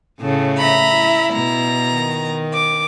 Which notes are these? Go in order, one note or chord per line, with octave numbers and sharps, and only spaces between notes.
A2 C#3 A3
E5 A#5 B5
E4
B2 A#5
D#3
D6